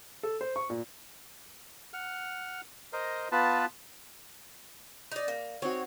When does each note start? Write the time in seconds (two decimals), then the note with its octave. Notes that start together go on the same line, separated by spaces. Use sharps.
0.23 A4
0.41 C5
0.56 C#6
0.70 A#2
1.93 F#5 F6
2.93 A#4 C5 D#5
3.32 B3 F4 B4 A5
5.12 D#4 D5
5.28 A#3
5.62 C4 D#4 F#4 C#5